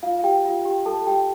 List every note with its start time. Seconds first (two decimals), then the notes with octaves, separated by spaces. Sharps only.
0.03 F4 F5
0.19 F5
0.24 G4 G5
0.45 F4 F5
0.65 G4 G5
0.85 A4 A5
1.07 G4 G5